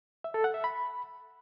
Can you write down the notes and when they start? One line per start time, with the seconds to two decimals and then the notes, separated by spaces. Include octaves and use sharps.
0.24 E5
0.34 A4
0.44 F#5
0.54 E5
0.64 B5